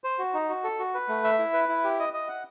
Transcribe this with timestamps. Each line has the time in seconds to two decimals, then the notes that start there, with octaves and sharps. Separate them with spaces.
0.04 C5
0.19 F#4
0.34 D#4
0.49 F#4
0.64 A4
0.79 F#4
0.94 B4
1.09 A3
1.24 E5
1.39 E4
1.53 B4
1.69 E4
1.84 G4
1.99 D#5
2.13 D#5
2.28 F#5